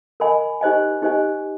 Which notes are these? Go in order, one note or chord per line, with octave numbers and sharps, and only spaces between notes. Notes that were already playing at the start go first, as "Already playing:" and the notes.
A#4 D#5 G#5 B5
D#4 G4 C5 D#5 G#5
D#4 G4 C5 D#5 G#5